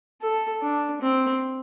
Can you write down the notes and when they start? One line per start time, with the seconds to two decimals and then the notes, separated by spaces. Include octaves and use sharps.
0.21 A4
0.62 D4
1.01 C4